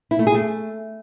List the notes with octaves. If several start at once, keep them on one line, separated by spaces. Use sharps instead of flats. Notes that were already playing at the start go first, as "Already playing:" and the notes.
E4
A3
G#4
A3